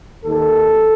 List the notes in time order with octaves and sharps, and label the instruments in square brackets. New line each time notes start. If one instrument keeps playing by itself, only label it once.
[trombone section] D#2 D#3 A4